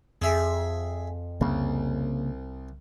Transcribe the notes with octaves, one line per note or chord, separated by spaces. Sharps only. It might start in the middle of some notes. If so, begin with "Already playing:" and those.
F2 G#4 E5
C2 C#3 A#3